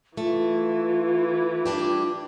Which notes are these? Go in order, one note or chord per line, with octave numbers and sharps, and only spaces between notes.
E3 A3 F4
G3 D4 G4